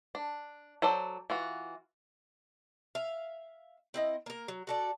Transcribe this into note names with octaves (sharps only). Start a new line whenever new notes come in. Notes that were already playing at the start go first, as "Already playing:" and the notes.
D4
F#3 A4 C5 D5
E3 F4 F#4
E5 F5
C4 E4 D#5
A#3 A#4
F#3
F#4 A4 D5